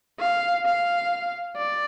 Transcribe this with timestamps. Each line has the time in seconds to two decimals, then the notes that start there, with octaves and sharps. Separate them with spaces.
0.20 F5
0.66 F5
1.57 D5